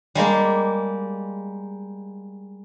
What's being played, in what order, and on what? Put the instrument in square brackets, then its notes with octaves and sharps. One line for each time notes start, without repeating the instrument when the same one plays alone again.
[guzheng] G3 G#3 A#3 G4